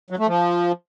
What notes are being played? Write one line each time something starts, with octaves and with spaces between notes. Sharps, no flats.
F#3
A3
F3